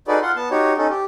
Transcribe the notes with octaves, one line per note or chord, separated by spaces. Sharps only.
D#4 F#4 G#4 A4 B4 D5
F4 F#5 C6
B3 A5
D#4 F#4 G4 C#5
C#4 D#4 A4
G4